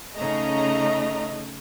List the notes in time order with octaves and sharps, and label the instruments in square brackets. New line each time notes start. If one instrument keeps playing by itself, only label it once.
[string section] C#3 A#5 [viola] A3 D#4 [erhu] D#5